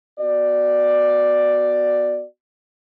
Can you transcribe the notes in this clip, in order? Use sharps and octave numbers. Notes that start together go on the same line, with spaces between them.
B3 F#4 D5